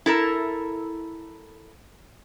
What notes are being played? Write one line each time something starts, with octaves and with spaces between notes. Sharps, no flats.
E4 A4 A#4